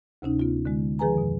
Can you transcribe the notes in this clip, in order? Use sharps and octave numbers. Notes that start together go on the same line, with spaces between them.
D2 C3 C#4 D#4
B3 F4
D3 G#3
D#3 F3 G#4 B4 G#5 A#5
F2 B2